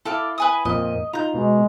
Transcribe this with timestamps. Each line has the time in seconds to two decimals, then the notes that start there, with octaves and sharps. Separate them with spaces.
0.05 E4 A4 F5 D6
0.38 B4 G#5 D#6
0.65 F2 A#2 F3 D#5
1.13 D#4 F4 A#5 G6
1.35 B2 G#3